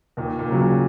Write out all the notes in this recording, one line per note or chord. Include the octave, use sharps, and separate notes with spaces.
D#2 A#2
A#2
C#3 F#3
A#2